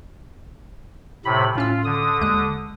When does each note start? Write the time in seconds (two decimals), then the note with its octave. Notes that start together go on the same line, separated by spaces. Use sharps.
1.25 A2 C3 B5
1.56 A2 C#4 F4 E6
1.85 D3 D#6
2.21 D#2 G#3 F#6